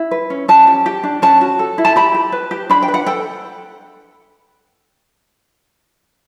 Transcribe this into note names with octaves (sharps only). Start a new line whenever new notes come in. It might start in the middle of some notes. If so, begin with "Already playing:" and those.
Already playing: E4
B4
C#4
C#4 A5
G4
G4
D4
C#4 A5
F#4
A4
E4
A5
G4 B5
G4
B4
G4
D4 B5
G5
B4
F#5
A4 G5